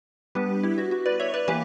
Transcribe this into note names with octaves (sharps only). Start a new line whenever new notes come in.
G3 B3 D4 G4 B4
E4 G4
F#4
F#4
B4 D5
C#5 E5
B4 D5
E3 A#3 G4 B4